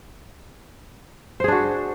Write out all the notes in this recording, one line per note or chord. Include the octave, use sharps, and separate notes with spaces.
D4 F#4 G#4 C5